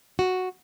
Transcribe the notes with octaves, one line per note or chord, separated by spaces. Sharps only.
F#4